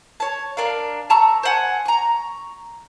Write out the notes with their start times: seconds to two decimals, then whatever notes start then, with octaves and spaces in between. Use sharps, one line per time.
0.20 C#5 A5
0.57 D4 A#4 F5
1.10 A5 A#5 C#6 E6
1.43 C5 F#5 G#5
1.85 A#5 C#6